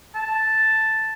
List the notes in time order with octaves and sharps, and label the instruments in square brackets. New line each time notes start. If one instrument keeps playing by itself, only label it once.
[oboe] A5